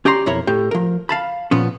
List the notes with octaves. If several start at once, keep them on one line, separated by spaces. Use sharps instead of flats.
C#4 G4 D5 A#5 C6
B1 F2 E4 A#4 C#5
A2 G4
F3 A#4
F5 A5 B5
A#2 F3 B3 C#4